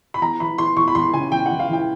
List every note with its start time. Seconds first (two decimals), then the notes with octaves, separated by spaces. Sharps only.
0.14 B5
0.22 E2 A#5
0.40 E3 B5
0.58 E3 C6
0.76 E2 C#6
0.88 B5
0.95 E2 C6
1.14 C#3 G#5
1.32 E2 G5
1.46 F#5
1.51 E3
1.60 F5
1.69 E3 G5